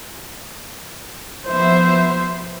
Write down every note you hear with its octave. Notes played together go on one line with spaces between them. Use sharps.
F3 B3 C5 E5